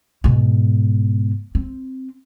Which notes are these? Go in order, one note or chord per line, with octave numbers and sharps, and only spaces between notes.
G#2 B2
C4